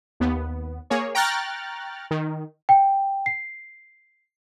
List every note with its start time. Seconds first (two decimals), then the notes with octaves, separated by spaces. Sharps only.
0.20 D#2 B3
0.90 A#3 G#4 C#5
1.15 G5 A#5 C#6 F6 F#6 A6
2.11 D#3
2.69 G5
3.26 C7